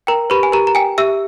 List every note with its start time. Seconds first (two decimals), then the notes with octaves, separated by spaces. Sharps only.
0.07 A#4 G5 A#5
0.30 G4 B4 B5
0.43 G#5
0.52 G4 A#4 A#5
0.67 A#5
0.75 G5 G#5
0.98 G4 E5 E6